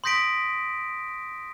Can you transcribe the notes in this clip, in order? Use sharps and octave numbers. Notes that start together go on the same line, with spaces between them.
C6 D#6 G6 A#6 B6 D7